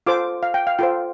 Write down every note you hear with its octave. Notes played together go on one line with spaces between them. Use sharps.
F4 A4 C5 D6
F5
G5
F5
F4 A4 C5 G5